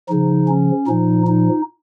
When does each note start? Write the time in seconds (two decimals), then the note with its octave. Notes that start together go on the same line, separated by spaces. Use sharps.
0.08 C#3 F3 D#4
0.48 C#4
0.87 A#2 F3 D#4
1.26 D#4